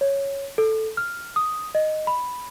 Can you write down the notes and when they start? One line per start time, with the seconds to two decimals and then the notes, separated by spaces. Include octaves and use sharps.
0.01 C#5
0.58 A4
0.97 F6
1.36 D#6
1.75 D#5
2.07 B5